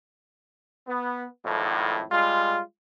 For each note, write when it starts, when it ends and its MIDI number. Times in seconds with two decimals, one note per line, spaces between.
0.87 1.25 59
1.44 2.02 32
1.44 2.02 41
1.44 2.02 45
2.10 2.59 55
2.10 2.59 56
2.10 2.59 65